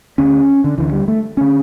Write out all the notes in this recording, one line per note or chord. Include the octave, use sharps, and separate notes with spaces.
D2 D3 C#4
D3
D2 D3 E3
G3
A3
D3 C#4